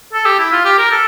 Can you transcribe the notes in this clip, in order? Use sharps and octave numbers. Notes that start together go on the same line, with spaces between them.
A4
G4
E4
F4
G4
A#4
A4